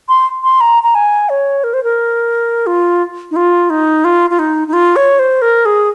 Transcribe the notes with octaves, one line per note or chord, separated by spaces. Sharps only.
C6
C6
A#5
A#5
G#5
C#5
A#4
C5
A#4
F4
D#4
F4
D#4
F4
F4
D#4
D#4
F4
C#5
C5
A#4
G#4